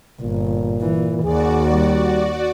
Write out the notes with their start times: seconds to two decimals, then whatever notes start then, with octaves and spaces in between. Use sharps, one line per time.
0.21 G1 A#2
0.81 E3
1.24 D#2 F#4 G#4 D5
1.72 G3